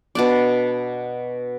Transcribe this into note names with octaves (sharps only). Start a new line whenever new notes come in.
B2 D4 D5